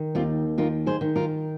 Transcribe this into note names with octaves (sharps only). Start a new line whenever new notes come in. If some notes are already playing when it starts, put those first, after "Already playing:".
Already playing: D#3
D#2 C4 F4
D#3 F4 A#4
G#4 C5
D#3
F4 A#4